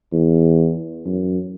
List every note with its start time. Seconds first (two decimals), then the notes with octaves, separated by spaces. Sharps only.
0.12 E2
1.05 F#2